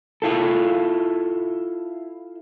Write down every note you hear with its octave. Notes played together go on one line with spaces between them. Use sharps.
E4 F4 A4